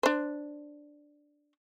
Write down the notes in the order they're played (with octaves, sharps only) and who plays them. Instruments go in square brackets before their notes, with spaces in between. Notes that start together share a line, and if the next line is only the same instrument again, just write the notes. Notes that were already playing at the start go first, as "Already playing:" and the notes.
[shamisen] D4 C5